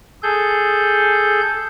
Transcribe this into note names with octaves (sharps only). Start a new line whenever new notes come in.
G#4 A4 G6